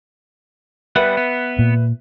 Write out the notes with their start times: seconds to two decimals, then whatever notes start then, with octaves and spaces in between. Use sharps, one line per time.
0.96 G3 B3 B4 E5 F#5
1.17 B3
1.59 A#2